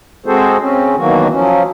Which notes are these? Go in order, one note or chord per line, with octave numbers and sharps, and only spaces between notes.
G#3 C4 F#4 G#4 A4 C5
C#3 C4 C#4
B2 D#3 E3 F#3 A#3 F#4
F3 F#3 C#4